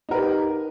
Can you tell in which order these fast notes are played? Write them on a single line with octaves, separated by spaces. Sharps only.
D#4 A#4 B4 G4